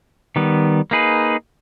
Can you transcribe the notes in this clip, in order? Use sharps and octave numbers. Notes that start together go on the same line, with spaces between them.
D#3 G3 B3
A#3 D#4 G#4 B4